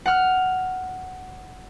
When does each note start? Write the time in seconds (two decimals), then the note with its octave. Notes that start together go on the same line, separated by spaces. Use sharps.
0.06 F#5 F6